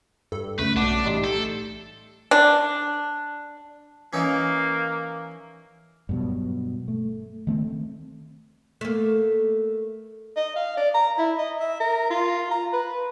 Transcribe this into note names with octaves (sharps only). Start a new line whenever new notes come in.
G2 A4
C#2 A3 B4
B1 D4 F#4 D6
A1 G3 D#4 C6
A4 G6
D4
E3 A#3 C#4 D#4
G2 B2 F#3
A3
D#3 A3 C4
A3 A#3
D#5
F5
D5
A#5
E4
D#5
E5
A#4
F4
A#5
B4